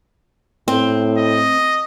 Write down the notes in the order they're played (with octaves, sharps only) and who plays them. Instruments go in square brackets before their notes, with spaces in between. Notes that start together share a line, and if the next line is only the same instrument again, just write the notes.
[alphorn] A2 [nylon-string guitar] C4
[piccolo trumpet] D#5